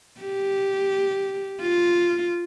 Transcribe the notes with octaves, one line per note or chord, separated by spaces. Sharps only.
G4
F4